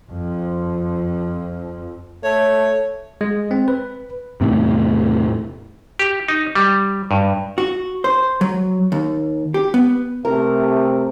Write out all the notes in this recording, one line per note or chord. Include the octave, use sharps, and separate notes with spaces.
F2 F3
A3 C#5
G#3
C4
B4
E2 A2 C3
G4
D#4
G3
G2
F#4
C5
F#3
D#2
G4
B3
C3 A3 A#4